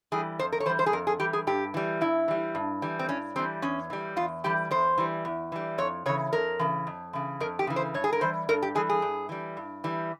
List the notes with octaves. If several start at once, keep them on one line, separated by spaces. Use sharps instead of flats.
E3 G3 G#4
F2 C5
A#4
C#5
E3 G3 C5
C5
G#4
F2 A#4
G#4
E3 G3 G4
G#4
G2 G4
E3 G3
G2 E4
E3 G3
G2
E3 G3
C4
G2 C#4
E3 G3 C4
E2 C#4
E3 G3
E2 F4
E3 G3 G4
E2 C5
E3 G3
E2
E3 G3
F2 C#5
C#3 E3 C#5
F2 A#4
C#3 E3
F2
C#3 E3
F2 A#4
G4
C#3 E3
C5
G2 C#5
G#4
A#4
E3 G3 C5
G2 A#4
G4
E3 G3 G#4
G#4
G2
E3 G3
G2
E3 G3